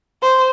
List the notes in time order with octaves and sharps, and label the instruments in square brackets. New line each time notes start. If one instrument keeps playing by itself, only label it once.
[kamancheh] C5